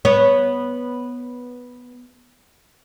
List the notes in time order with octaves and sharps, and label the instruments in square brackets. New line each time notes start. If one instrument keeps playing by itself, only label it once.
[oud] B3 C#5